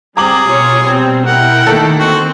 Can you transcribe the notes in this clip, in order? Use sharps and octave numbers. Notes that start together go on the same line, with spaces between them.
G3 C4 G#4 A#5 D6 F#7
B2 F4 C#5
G3 C4
E4 A#4 F#5 G5
D#3 A3 A#3 A4
C4 F#4